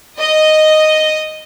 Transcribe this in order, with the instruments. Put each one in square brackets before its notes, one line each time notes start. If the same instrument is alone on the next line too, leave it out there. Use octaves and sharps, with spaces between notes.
[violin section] D#5